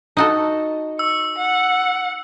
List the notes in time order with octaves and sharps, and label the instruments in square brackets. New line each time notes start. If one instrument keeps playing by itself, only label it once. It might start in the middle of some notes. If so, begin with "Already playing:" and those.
[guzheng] D#4 F#4 A4
[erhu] C#6 [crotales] E6
[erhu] F#5